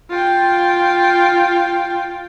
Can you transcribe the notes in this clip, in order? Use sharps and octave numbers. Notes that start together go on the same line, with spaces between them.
F4 G5